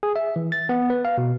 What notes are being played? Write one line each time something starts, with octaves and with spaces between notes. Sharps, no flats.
G#4
E5
E3
A6
B3
B4
F5
B2